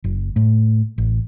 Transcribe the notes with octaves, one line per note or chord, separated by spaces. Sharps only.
F#1
A2
A1